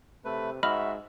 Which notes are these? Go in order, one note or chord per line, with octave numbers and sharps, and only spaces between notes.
C3 A3 B4
G#2 F#4 D#5 E5 B5 F6